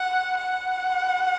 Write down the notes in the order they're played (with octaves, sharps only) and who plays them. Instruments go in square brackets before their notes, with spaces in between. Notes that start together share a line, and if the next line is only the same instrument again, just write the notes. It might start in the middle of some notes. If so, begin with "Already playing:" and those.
Already playing: [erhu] F#5
F#5